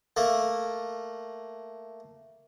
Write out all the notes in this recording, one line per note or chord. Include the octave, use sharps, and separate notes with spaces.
A3 A#3